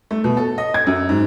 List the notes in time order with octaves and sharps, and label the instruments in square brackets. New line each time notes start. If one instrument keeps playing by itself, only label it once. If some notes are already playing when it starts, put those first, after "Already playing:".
[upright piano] A3
B2
A4
D#5
G#6
F#2
G#2